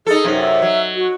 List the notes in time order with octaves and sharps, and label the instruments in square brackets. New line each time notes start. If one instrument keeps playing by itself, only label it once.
[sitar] D#4 A4 [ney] G#4
[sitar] F#2 C3 D#4
[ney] E5
[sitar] F#3
[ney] F#4